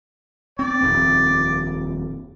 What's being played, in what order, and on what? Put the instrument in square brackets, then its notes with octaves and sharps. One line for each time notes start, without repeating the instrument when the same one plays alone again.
[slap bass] C4 [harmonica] D5
[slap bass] D#1 F2 C4